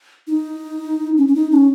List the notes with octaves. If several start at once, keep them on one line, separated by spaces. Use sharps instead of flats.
D#4
C#4
C#4
D#4
C#4